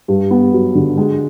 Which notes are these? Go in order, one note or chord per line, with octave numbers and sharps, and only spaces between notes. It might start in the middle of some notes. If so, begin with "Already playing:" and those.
G2
B3
F#3
D3
G#3